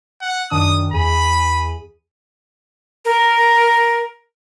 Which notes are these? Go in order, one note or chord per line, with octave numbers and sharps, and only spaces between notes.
F#5
F#2 D#3 D4 D#6
E2 G#4 B5 D#7
A#4